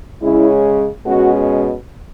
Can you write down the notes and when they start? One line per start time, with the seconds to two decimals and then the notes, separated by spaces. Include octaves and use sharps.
0.21 C#3 G#3 C#4 E4
1.05 B2 G#3 C#4 F#4